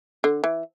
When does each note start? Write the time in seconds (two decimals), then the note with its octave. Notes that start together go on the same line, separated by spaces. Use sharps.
0.24 D3
0.44 E3